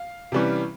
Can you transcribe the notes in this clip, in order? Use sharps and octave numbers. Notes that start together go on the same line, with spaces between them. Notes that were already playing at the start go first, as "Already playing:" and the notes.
Already playing: F5
C3 E3 G3 C#4